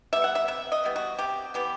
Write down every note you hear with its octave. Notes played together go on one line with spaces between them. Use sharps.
G3 B3 E5
F#5
E5
C3 E5
D#5
E3 G3 B3
F#4
C3 G4
E3 G3 B3 G4